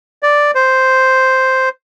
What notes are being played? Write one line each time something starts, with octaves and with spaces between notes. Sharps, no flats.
D5
C5